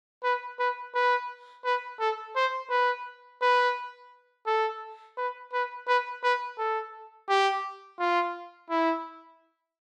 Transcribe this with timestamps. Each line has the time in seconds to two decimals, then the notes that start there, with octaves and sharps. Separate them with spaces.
0.24 B4
0.59 B4
0.95 B4
1.65 B4
2.00 A4
2.36 C5
2.70 B4
3.42 B4
4.46 A4
5.17 B4
5.53 B4
5.88 B4
6.23 B4
6.59 A4
7.29 G4
7.99 F4
8.70 E4